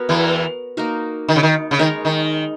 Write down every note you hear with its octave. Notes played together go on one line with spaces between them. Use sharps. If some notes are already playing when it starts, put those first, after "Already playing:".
Already playing: B3 F#4 A#4 C#5
E2 E3
A#3 D#4 F#4 A#4
D#3
C#3
D#3
C#3
D#3 G#3 D#4 A#4 C#5
D#3